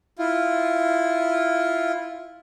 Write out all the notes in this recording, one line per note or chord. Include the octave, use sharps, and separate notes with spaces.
E4 F4